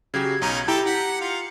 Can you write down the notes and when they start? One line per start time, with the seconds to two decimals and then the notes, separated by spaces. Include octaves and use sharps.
0.14 C#3 F#3 G4 G#6
0.42 B1 C#4 D#4 A#5
0.68 E4 G4 A4 G5 A5 A#5 G6
0.86 F#5 B6
1.06 C#7
1.21 F4 F5